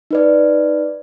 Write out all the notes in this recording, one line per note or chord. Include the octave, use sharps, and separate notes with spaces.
D#4 B4 D5